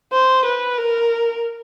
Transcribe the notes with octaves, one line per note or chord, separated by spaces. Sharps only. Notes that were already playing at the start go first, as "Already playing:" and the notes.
C5
B4
A#4